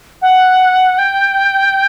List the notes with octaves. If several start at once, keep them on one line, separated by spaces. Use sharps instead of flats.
F#5
G5